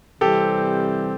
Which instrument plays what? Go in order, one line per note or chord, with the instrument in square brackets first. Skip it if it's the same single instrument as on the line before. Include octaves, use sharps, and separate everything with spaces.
[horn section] C3 E3 G3 C4 [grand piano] G4 A4